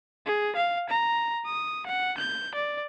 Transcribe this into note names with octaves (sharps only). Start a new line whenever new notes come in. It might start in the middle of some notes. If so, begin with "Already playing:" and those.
G#4
F5
A#5
D#6
F#5
G6
D5